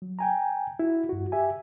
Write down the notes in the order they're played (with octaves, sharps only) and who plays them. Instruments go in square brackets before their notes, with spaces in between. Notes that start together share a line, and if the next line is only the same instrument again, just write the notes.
[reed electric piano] F#3
G5 G#5 A#5
E4 F#4
G2 F#4
G4 E5 G#5